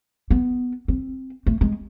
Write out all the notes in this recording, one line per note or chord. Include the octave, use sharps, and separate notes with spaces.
B3
C4
A3
G#3